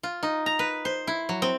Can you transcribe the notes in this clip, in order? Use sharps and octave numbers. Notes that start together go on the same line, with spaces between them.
F4
D#4
A#5
B4
C5
E4
F#3
C4